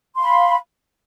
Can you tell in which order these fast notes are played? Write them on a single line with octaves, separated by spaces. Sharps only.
C6 F5 B5